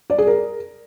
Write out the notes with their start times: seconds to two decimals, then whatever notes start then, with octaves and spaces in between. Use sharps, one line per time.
0.10 D5
0.18 G#4
0.27 A#4